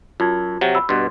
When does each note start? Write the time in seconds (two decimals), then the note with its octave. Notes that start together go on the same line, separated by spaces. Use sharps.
0.20 F#2 F4 A5 G#6
0.61 C3 F#3
0.75 B5 E6
0.89 G2 B2 C6